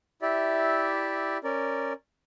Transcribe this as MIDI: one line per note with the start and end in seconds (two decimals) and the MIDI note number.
0.22 1.38 64
0.22 1.38 67
0.22 1.38 74
0.22 1.38 76
1.44 1.93 61
1.44 1.93 70
1.44 1.93 74